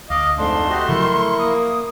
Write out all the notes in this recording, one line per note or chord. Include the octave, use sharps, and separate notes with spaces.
D2 D#5 F5 D6
F2 G#2 A3 D4 C6
F#4 G4 D#5
C#3 F3 F#3 E4 A#4 C#6
A#3 D#6